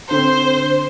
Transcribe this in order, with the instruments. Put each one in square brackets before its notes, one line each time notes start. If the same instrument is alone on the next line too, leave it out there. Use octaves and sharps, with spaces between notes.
[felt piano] D3 C4 [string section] C5